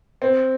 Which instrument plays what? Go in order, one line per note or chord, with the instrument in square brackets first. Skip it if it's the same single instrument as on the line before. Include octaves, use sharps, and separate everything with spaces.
[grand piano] C4